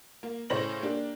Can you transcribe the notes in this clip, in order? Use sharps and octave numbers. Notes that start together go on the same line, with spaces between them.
A#3
A2 C#3 C5 C#5 A#6 F#7
A#3 D4 G4